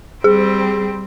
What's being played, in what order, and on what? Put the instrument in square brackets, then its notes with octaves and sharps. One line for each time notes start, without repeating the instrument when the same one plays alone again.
[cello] G3 C4 [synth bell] G#4